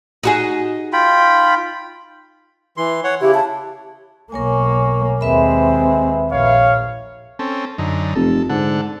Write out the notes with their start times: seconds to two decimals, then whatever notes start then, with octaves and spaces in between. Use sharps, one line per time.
0.23 D#4 F#4 G#4
0.93 F4 G5 B5
2.77 E3 C6
3.04 C#5 F#5
3.21 C#3 E4 G4
3.34 A5
4.32 B1 A#3 A#4 C#5 G#5 C#6
5.21 D#2 G#3 C4 B4 E5 B5
6.32 A#1 C#5 F5
7.39 C4 C#4 A4
7.78 F#2 D3 D#4
8.15 F1 A4
8.50 G#2 D3 A4 F#5